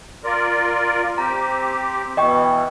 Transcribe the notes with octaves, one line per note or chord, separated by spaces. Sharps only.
F4 A#4 D5
C4 G4 A#5
B2 E3 D#5 G5 C#6